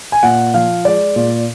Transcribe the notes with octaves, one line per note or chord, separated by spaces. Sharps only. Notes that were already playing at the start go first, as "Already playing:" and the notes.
G#5
A#2 F#5
F3 F5
G#3 D5
A#2